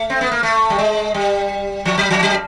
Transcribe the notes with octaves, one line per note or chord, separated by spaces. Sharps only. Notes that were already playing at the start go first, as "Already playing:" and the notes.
Already playing: A3
C4
B3
A#3
A3
G3
G#3
G3
F3
F#3
F3
F#3